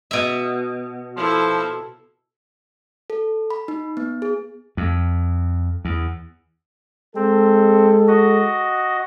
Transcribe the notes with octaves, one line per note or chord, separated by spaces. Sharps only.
B2 E5
F3 E4 A4
A4
B5
D#4
B3
G#4
F2
E2
G#3 C4 A4
F#4 D#5